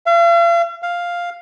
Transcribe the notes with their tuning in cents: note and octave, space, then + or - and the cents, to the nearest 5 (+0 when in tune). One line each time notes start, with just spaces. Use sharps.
F5 -45
F5 +0